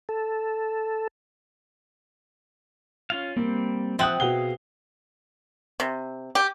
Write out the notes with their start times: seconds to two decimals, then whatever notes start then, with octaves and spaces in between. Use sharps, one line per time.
0.09 A4
3.10 C#4 F4 F5
3.36 G3 A#3 C4
3.99 F3 C4 E5 F#5 D#6 F#6
4.20 B2 G#4 F5 F#5 G7
5.80 C3
6.35 G4